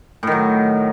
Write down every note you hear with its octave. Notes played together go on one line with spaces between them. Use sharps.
A2 D#3 F#3